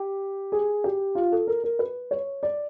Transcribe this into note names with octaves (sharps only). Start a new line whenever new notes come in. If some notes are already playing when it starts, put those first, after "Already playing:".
Already playing: G4
G#4
G4
F4
A4
A#4
A#4
B4
C#5
D5